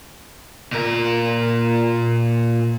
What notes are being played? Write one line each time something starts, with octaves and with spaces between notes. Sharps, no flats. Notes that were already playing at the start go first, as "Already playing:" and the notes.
A#2 A#4